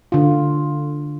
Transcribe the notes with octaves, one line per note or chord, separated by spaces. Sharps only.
D3 F4